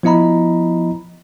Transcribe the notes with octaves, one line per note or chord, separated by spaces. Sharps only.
F3 B3 E4 D#5 A#5 B5